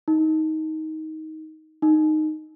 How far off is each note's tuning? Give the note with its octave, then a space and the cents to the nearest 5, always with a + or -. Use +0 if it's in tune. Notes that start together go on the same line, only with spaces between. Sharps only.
D#4 +15
D#4 -10